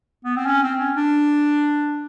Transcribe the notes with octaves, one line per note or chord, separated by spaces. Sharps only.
B3
C4
C#4
C4
C#4
D4